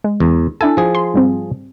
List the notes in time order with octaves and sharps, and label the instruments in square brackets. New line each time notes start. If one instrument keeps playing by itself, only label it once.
[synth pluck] G#3
[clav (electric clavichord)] E2
[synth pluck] D4 E4 G#5 [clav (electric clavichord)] A4
[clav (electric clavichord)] F3 G#4
[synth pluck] C6
G#2 G3 C4